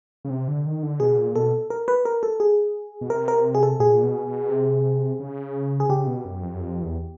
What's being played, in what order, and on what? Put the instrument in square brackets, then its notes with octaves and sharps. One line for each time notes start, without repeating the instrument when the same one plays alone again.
[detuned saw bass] C#3
C3
D3
D#3
D3
[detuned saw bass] B2 [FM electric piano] G#4
[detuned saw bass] A#2
[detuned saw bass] B2 [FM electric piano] A4
[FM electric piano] A#4
B4
A#4
A4
G#4
[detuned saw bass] B2
[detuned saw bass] C3 [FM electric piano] A#4
[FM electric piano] A#4
G#4
A4
[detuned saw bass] A#2 [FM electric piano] G#4
[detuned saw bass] B2
B2
C3
C#3
[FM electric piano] G#4
[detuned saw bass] C#3 [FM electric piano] G4
[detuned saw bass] B2
F#2
F2
F#2
F2
E2